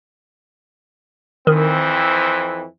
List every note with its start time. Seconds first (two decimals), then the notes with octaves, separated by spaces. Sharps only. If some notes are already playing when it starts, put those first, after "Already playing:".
1.47 F2 D#3 E3 C4